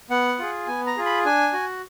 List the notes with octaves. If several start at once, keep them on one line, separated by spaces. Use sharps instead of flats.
B3 F#5
F4 G#4
B3 G#5
A#5
F4 G#4
B5
D4 G#5
F#4